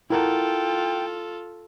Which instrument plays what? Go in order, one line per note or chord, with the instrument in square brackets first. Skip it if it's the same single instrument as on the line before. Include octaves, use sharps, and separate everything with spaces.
[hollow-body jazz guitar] E4 A#4 F#5 [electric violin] F4 A4 [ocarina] G5